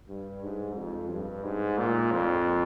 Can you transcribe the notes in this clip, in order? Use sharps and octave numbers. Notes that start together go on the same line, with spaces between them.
G2
G#2
F2
G2
G#2
A#2
F2